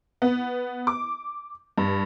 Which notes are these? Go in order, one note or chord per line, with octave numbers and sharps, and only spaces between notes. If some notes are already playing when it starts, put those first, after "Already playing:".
B3
D6
G2